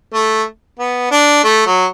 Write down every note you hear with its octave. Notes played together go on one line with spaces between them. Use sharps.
A3
B3
D4
A3
F#3